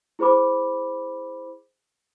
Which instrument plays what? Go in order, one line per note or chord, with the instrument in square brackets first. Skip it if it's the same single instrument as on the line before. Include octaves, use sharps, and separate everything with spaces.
[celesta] E4 G#4 C5 B5 D6